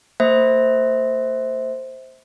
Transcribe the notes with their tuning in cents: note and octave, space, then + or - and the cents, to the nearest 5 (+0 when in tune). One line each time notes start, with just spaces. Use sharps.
A#3 -45 C5 +0 E5 -30